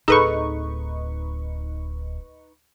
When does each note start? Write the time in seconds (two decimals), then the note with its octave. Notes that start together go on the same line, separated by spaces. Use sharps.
0.08 D1 D#4 G#4 A4 B4 C#6